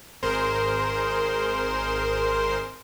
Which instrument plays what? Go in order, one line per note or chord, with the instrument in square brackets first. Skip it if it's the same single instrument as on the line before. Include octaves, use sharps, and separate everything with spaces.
[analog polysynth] G#1 G#4 A#4 C5 C6